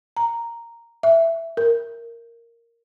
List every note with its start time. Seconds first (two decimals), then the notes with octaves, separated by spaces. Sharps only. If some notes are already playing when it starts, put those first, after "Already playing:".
0.17 A#5
1.03 E5
1.57 A#4